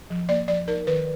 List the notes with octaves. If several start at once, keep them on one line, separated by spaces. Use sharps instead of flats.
F3
A#3 D5
F3 D5
D#4 A#4
D#3 B4